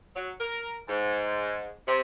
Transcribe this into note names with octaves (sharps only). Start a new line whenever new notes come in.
F#3
A#4
G#2
C3